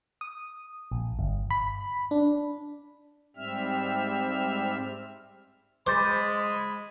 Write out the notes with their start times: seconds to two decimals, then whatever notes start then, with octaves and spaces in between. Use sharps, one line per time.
0.21 D#6
0.91 A#1
1.19 G1
1.50 B5
2.11 D4
3.36 G#2 G3 C4 E5 F6
5.87 G#3 C5 B5 D6 G6 A6